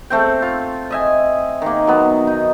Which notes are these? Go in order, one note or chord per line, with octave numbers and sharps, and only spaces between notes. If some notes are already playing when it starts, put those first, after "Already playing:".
A3 C4 G5
F4
D#5 E5 G#5
D#3 A#3
F#3 B3
D#4